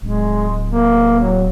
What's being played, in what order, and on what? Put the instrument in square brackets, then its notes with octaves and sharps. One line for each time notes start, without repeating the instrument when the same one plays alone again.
[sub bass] D1 [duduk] G#3
[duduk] A#3
F#3